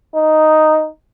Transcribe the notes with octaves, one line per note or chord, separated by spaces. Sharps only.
D#4